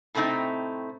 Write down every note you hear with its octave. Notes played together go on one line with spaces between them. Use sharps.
A2 C3 A3 C4 D#4